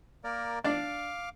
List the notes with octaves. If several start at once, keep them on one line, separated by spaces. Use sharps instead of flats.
A#3 A#4 D5
D4 D5 F5 D6